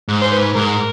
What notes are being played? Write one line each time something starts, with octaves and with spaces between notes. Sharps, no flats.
G#2
C5
B4
G#2 A#4